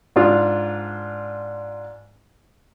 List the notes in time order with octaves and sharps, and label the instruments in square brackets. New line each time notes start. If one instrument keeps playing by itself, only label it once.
[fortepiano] G#2 D4 F4